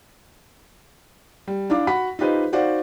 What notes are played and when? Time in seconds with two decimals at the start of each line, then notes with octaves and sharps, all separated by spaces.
1.48 G3
1.70 D4 E4 F5 D6
1.87 F#4 F#5 B5 B6
2.19 D#4 F4 G4 B4 C5 D#5
2.52 D#4 F#4 C5 D5 F5 F#5